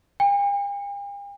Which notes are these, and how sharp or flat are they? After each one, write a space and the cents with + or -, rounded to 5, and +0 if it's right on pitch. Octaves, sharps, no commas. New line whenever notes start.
G5 +45